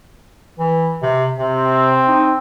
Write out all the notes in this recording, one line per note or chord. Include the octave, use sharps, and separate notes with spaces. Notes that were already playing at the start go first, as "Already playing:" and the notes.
E3
C3
C3 C4
D#4